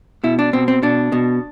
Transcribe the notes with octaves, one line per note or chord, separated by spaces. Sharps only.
B2 E4
D4
B2 C4
C4
B2 D4
B2